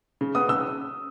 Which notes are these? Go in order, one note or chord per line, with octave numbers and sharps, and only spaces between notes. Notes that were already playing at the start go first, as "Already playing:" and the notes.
C#3
B3 D#6
C#3 E6